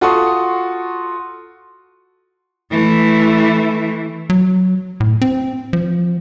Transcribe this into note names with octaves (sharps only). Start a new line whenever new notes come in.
F4 F#4 A4 C6 C#6 D#6
E3 A3
F#3
A2
C4
F3